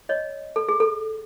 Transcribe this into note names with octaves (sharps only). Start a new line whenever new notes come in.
C#5 D#5
A4
G#4
A4